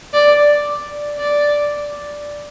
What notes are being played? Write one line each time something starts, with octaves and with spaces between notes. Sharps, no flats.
D5
D5